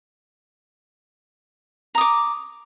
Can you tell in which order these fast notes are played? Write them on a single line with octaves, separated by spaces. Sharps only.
A#5 D#6 D6